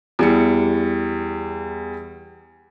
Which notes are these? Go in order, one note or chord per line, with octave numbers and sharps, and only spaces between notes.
E2 G3 C#7